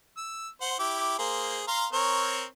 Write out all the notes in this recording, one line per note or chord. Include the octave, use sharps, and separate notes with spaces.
E6
C5 F#5
E4 G4 D6
A#3 G#4 C5
F5 A#5 C6
C4 A#4 C#5